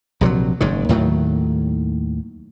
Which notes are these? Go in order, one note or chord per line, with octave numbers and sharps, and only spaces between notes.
A#1 C3 F3 F#3
F#1 G#2 D#3
D#2 A2 D#3 F#3